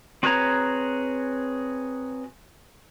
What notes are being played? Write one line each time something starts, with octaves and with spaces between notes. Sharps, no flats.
C4 F#4 G#4 B4 C#5 A#5